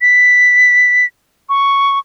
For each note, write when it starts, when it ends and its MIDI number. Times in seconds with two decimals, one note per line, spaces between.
0.01 1.05 95
1.49 1.99 85